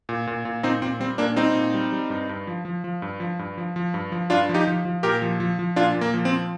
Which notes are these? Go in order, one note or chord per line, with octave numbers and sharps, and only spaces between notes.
A#2
A#2
A#2
A#2 C4 D#4
A#2 C4
G3 C4
A#2 A#3 D4
G3 C4 D#4
A#2
G3
G3
G2
G2
F3
F3
F3
G2
F3
G2
F3
F3
G2
F3
G2 D4 F4
F3
D#4 G4
F3
F3
A#2 G4 A#4
F3
F3
F3
A#2 D4 F4
A#2
A#3
F3
C4
F3